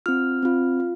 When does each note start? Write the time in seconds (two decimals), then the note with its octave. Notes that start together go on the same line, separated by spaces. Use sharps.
0.06 C4 F4 F6
0.43 C4 F4
0.80 F4